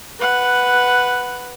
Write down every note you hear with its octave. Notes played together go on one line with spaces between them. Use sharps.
B4 F#5